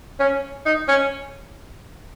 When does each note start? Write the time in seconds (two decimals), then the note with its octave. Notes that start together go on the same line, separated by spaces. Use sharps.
0.20 C#4
0.66 D#4
0.88 C#4